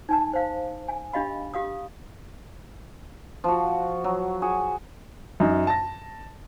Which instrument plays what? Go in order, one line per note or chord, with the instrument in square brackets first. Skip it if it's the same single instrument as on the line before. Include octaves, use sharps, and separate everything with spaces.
[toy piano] D#4 G#5 A5
C5 F5
G#5
D4 G4 D#5 F5 B5
G4 F5 D#6
[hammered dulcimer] F3 F#4
F#3
F#4 G#4
[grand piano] F#2 D#4
A5 A#6